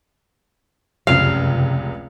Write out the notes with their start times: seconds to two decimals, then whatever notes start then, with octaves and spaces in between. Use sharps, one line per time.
1.07 F1 C#2 F#2 C3 F5